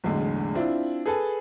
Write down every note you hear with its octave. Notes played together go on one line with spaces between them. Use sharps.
B1 E2 A2 D3 G#3
C4 D4 E4 F4
G#4 A4 B4 A5